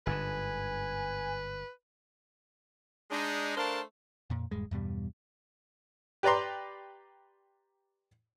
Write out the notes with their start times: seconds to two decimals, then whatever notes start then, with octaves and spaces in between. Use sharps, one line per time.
0.07 G1 G#2 D3 B4 G#5
3.11 G#3 D4 D#4
3.57 A3 D4 A#4 C5 F5 A5
4.30 F2 A#2
4.51 D#1 G2 G#3
4.71 E2 G2 B2 G3
6.23 G4 B4 D5 A#5 C6